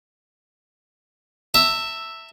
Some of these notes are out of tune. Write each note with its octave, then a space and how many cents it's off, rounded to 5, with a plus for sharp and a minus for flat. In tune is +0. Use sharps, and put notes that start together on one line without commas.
E5 +0 A5 +45